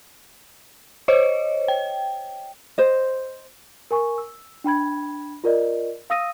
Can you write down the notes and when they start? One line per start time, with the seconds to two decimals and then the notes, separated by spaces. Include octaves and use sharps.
1.08 C5 C#5 D#5
1.68 G5
2.78 C5 D#5
3.91 A#4 G#5 C#6
4.18 E6
4.64 D4 G5 B5 G#6
5.44 F4 A#4 D5 D#5
6.10 F5 D#6 E6 A#6 D#7